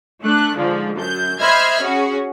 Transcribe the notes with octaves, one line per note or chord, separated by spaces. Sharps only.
A3 D4 F#6
G#2 D3 F3
F#2 G6
C5 D#5 E5 B5 F6 G#6
C#4 F#4 G#4